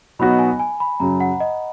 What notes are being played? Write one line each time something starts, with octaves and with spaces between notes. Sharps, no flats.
B2 F#3 B3 D#4 F#4 B5
G#5
G#5
B5
F#2 C#3 F#3 A#5
F#5
D#5